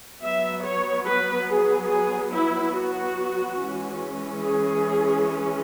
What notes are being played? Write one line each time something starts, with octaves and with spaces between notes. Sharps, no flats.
F#3 B3 E5
C#5
B4
G#4
G#4
E4
F#4
E3 G#3 C#4
G#4